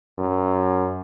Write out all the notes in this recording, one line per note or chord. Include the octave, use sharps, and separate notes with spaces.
F#2